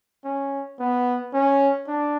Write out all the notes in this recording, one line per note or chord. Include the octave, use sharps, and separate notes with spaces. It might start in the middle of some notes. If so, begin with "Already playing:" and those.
C#4
B3
C#4
D4